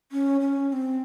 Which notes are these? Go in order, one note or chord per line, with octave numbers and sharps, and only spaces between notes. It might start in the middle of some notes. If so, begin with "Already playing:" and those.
C#4
C#4
C#4
C4